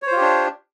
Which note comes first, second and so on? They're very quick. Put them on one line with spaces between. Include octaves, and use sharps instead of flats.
C#5 C5 F4 G4 D4